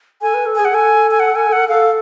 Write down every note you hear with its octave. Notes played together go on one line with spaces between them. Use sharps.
A4 G#5
B4
A4
G#4 G#5
F#5
A4 G#5
G#5
F#5
G#5
F#5
A4 F5